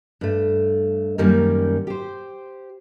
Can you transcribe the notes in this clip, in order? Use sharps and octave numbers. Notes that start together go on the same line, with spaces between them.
G2 A3
F#2 D#3 G3 A#3 C#4
G4 C5